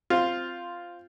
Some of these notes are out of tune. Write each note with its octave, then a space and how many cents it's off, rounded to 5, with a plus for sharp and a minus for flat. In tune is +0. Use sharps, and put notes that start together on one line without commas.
C4 -5 F4 +0